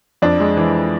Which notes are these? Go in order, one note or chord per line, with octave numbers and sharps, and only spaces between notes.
F2 D4
G#3
E3